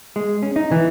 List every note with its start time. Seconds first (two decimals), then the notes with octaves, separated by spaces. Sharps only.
0.16 G#3
0.43 C#4
0.56 D#4
0.71 E3